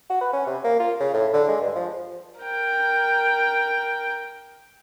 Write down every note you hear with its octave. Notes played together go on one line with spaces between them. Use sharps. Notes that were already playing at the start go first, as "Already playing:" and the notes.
F#4
B4
C#4
C3
A#3
F4
C#3
A2
D3
G#3
G2
F3
A#4 G5